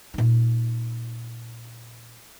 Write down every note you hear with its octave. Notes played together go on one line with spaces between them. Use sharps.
A#2 D#4